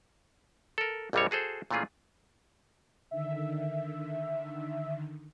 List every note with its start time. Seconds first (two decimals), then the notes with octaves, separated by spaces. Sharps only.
0.78 A4 A#4
1.13 A#1 F2 D3 G3 C4 C#5
1.31 F#4 G#4 A4 C5
1.71 A#2 E3 A3 C#4 F4 G#4
3.11 D3 D#3 E5